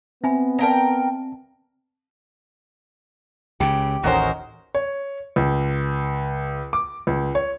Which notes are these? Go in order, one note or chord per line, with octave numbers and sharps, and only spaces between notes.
B3 C4 E5 G#5 B5
A#4 D5 F5 G5 A5 A#5
C#2 C#3 G4
A1 D#2 C#4 D#4 F#4 A#4 C5
C#5
C#2
D6
C#2
C#5